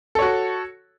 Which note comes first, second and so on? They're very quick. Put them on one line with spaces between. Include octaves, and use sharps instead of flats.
A4 C#5 F#4